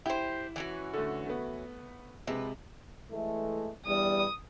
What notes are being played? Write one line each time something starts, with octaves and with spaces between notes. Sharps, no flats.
E4 G4 C5
E3 C#4 F#4
D3 A3
A3 B3
C3 F3 G#3 B4
E3 G#3 A3
E2 G2 G3 D#6